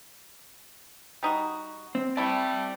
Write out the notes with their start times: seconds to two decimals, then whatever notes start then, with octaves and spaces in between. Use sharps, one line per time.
1.23 G3 D#4 F#4
1.95 C4
2.17 A3 E4 D5 G5